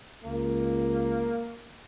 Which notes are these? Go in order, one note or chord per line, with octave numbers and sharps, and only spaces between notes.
C#2 A#3